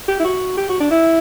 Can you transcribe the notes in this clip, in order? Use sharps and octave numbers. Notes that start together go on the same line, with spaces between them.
G4
E4
F#4
G4
F#4
D4
E4